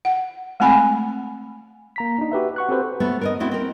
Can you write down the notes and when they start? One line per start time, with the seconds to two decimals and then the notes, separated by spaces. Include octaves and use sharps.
0.05 F#5
0.60 G#3 A3 C4 G#5 B5
1.96 A#3 A#5 B6
2.19 D4 D#4
2.32 F#4 G4 B4 E5
2.56 F#5 C#6 F#6
2.69 C4 F#4 G4 A4 B4 C5
3.00 A3 B3
3.21 A#4 C#5 D#5
3.40 A3 C4 E4 F#4
3.51 C4 A#4